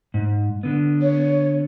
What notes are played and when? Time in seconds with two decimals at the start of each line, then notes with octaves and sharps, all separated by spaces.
0.14 G#2
0.63 D3 B3
1.02 C#5